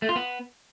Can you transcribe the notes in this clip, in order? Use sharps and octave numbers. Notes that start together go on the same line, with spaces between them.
A3
F4
B3